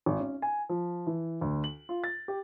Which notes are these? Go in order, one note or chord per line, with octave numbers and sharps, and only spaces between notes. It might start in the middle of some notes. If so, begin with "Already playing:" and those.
G#1
C#4
G#5
F3
E3
D2
F#7
F4
A6
G4